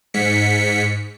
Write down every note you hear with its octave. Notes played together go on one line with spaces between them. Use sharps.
G#2 B6 C#7